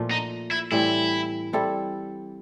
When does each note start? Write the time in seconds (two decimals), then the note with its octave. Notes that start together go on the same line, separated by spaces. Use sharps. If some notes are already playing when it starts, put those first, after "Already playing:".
Already playing: A#2 F3 A3
0.11 D#4
0.51 E4
0.71 A2 E3 G3 C4 E4
1.53 G3 C4 E4 A4